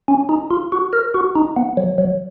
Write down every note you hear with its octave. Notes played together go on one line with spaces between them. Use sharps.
C#4
D#4
F4
F#4
A#4
F#4
D#4
B3
F#3
F#3